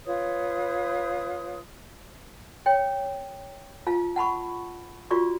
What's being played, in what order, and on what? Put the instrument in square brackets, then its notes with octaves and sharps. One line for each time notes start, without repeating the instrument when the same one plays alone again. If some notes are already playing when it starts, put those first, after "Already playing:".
[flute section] F4 B4 C#5 D#6
[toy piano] C#5 G5
F4 F5 A5
F#5 A5 B5 C#6
F4 F#4 D5 C#6